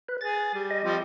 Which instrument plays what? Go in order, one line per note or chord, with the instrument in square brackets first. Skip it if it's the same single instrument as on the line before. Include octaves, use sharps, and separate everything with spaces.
[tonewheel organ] B4
[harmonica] G#4 [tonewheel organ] A6
[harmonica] G3
[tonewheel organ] D#5
[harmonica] F3 G3 C4